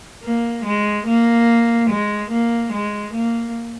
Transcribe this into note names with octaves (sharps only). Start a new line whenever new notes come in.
A#3
G#3
A#3
G#3
A#3
G#3
A#3